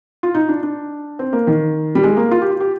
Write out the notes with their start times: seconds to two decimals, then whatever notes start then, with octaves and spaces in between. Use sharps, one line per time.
0.23 F4
0.34 D#4
0.49 D4
0.63 D4
1.19 C4
1.33 A#3
1.47 D#3
1.95 G3
2.04 G#3
2.17 A#3
2.31 F4
2.42 G4
2.51 F4
2.60 G4